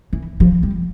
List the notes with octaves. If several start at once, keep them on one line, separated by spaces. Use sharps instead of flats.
E3
F3
G3